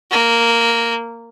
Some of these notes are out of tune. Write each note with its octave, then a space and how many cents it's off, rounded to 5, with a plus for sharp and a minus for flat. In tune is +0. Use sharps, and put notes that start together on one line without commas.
A#3 -5